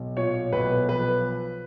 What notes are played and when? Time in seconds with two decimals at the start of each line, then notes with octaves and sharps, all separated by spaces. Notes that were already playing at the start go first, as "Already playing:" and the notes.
Already playing: B1
0.17 A#2 C#5
0.53 B1 B4
0.89 F3 B4